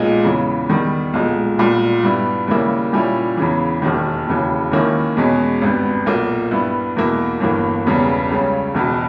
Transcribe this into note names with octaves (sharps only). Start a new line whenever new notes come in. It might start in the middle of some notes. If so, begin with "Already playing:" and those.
Already playing: B1 A#2 G#3 D#4
E2 C#3 E3
E2 D#3 G3
B1 A#2 G#3
B1 A#2 G3
G2 G3 B3 E4
D#2 C#3 G3 A#3 E4
A#2 G3 C#4 E4
E2 C#3 E3
E1 D#2 D#3
E1 D#2 C#3 E3
D#2 D#3 A#3 C#4 E4
E2 B2 G#3 C#4
G#1 G2 G3 B3
B1 A#2 A#3
G2 G3 B3 E4
E2 B2 A#3 E4
G1 G2 E3 A#3
E1 E2 C#3 G3 B3
C#2 C#3 G3 C#4
E1 E2 B2